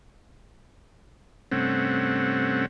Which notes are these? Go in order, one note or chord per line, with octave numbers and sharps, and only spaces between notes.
G2 C3 A3 C4 C#4 F#5